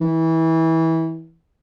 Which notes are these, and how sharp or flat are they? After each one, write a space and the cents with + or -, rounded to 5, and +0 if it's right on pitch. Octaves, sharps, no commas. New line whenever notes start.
E3 -25